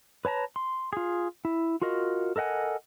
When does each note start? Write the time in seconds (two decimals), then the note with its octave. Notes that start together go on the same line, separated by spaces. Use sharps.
0.25 B4 C#5 A5 A#5
0.56 C6
0.93 F4 G#4
1.45 E4
1.82 F4 F#4 A#4 D#5
2.36 A4 A#4 D#5 F#5 G#5